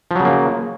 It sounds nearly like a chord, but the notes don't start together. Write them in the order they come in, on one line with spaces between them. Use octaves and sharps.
F3 F#3 C#3 A#3